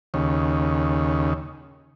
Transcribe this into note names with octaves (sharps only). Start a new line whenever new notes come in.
D#2 C#3